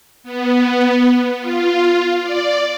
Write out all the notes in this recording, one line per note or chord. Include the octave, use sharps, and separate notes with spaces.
B3
F4
D5